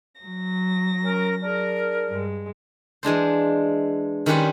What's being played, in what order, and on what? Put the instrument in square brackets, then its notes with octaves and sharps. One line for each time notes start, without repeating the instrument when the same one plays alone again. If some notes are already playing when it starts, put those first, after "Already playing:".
[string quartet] F#3 A#6
[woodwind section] C#4 A#4
D4 G#4 A#4
[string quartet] G2 G#3
[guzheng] E3 G#3 D4 C5
D#3 G3 C#4 G4 B4 C5